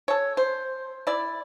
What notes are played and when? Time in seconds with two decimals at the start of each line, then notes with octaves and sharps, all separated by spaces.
0.08 A4 C#5
0.37 C5
1.07 E4 D5